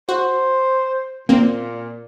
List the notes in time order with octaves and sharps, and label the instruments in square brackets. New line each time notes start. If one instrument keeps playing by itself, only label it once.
[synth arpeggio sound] F#4 [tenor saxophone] C5
[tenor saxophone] A#2 [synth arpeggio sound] A#3 C4